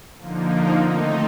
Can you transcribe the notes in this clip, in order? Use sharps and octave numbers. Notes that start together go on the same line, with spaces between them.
D3 F3 A#3 D#4
D#3 A3 C4 D#4